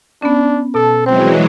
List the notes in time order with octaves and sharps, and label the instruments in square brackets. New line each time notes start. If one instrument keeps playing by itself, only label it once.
[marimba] B3 C#4 [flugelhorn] D4
[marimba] B2 A5 [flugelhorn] A4
[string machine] E3 F#3 G#3 [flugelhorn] C4 [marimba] C5